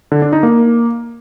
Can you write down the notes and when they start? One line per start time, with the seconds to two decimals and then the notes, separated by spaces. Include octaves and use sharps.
0.12 D3
0.22 D4
0.33 D#4
0.43 A#3